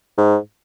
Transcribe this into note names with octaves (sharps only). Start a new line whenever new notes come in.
G#2